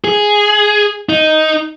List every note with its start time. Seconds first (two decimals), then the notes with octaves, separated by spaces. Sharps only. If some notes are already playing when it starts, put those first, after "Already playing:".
0.04 G#4
1.09 D#4